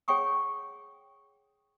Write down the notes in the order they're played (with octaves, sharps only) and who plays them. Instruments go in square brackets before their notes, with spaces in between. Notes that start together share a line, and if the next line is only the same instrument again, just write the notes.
[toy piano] G#4 C#5 F#5 G5 C#6 D#6